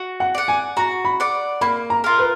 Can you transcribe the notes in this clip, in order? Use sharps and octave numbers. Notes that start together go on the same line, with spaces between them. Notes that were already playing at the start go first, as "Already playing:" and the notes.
Already playing: F#4
F#5
D5 F#5
G#5
F#4 A#5
B5
D5 F#5
A#3 B5
A#5
F4 A#4
B4